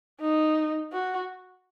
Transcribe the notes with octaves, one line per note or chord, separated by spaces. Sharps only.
D#4
F#4